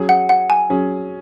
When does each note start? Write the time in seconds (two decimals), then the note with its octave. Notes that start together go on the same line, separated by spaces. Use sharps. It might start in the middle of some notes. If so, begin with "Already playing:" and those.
Already playing: F#3 C#4 G#4
0.09 F#5
0.29 F#5
0.50 G#5
0.70 F#3 C#4 G#4